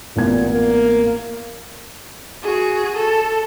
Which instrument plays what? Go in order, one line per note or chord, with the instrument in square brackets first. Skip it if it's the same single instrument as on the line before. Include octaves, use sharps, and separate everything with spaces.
[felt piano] A1 B3 G#6 [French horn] A#2
[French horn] A#3
[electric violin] F#4 G#4
A4